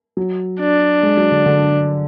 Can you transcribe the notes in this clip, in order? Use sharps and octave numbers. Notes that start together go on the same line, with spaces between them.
F#3
D4
G#3
F#3
D3
D3